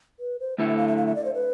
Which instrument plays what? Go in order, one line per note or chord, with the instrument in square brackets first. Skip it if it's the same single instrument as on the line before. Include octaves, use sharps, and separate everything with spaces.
[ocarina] B4
C5
[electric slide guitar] D3 A3 E4 A4 [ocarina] E5
[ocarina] E5
F5
E5
F5
E5
D5
C5
B4